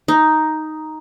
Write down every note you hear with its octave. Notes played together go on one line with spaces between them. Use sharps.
D#4